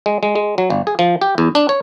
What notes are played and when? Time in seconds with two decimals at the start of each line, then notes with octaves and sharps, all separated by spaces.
0.06 G#3
0.23 G#3
0.35 G#3
0.58 F#3
0.70 G1
0.87 G#4
0.99 F3
1.21 G4
1.38 E2
1.55 D4
1.69 C#5